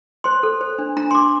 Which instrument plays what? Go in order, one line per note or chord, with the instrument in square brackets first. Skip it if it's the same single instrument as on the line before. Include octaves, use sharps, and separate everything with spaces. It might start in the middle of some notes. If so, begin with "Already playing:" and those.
[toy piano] C5 C6
A4
C5
D4
D4 A#5
C6
D4 D6